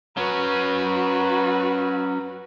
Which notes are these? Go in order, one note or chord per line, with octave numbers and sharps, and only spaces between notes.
F#3 C#4 F#4 B4